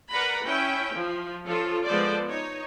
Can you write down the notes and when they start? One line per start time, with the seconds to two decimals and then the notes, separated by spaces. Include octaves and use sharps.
0.11 A#4 B4 D5 F#5 A#5 B5
0.44 C#4 E4 G5
0.95 F3
1.45 F3 C#4 F4 A4
1.86 F3 G#3 B3 A4 C5 D5
2.28 D#4 C#5